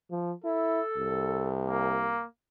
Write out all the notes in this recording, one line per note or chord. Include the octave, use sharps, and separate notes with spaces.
F3
E4 A4
C2
A#3